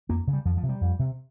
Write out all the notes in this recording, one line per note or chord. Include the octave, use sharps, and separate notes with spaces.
F2 A#3
C#3
G3
F2 F3
F3
C3
G3
F2
C3